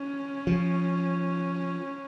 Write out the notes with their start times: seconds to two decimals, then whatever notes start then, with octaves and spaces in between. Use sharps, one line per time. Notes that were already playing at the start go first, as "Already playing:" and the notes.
Already playing: C#4
0.47 F3